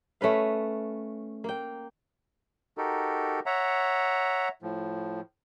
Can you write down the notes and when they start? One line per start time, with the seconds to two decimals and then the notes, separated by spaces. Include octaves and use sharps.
0.21 A3 C#4 B4 F5
1.44 A#3 G5
2.77 D#4 F#4 G4 A4 A#4
3.46 C#5 E5 F#5 A#5
4.62 A2 F3